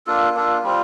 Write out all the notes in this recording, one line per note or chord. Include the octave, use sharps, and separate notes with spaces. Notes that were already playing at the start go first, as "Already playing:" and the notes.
A#3 D4 F4 A4
A#3 D4 F4 A4
G3 C4 F4